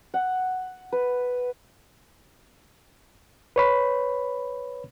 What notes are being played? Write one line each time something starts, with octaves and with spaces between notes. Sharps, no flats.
F#5
B4
B4 C#5 B5